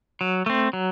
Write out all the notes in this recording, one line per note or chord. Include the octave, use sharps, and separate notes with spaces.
F#3
A3 C4
F#3